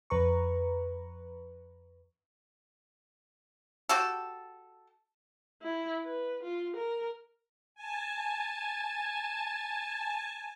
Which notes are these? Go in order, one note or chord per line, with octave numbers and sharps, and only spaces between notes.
F2 B4 A#5 C#6
F#4 G4 A4
E4
B4
F4
A#4
G#5 A5